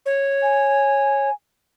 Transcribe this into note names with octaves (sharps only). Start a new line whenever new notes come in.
C#5
G#5